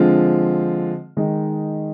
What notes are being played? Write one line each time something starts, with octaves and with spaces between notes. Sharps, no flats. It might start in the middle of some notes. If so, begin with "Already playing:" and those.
Already playing: D3 F3 G#3 C4 F4
D#3 G#3 D#4